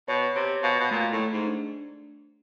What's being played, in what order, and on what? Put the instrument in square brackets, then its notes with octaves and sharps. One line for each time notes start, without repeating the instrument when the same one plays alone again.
[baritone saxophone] B2 [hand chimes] C#5
[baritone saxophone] C3 [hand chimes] C#5
[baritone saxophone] B2 [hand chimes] F5
[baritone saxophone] B2
[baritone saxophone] A#2 [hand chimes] A3
[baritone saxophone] A2
[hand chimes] A3
[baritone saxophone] G#2
[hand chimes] D4